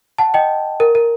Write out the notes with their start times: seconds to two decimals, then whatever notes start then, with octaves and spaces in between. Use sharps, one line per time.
0.18 F#5 A5
0.34 D#5 G5
0.80 A#4
0.95 A#4